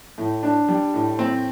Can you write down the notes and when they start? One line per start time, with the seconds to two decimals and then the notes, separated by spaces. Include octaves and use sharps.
0.18 A2
0.43 D4
0.69 G3
0.94 A2
1.19 C4